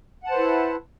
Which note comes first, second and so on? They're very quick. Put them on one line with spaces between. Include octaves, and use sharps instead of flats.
F#5 A5 C5 B4 E4